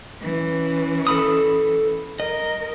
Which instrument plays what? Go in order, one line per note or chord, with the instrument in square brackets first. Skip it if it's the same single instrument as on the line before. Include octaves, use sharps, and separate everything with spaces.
[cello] E3 C#4
[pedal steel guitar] A4 B5 D#6
[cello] A#4 [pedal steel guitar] D#5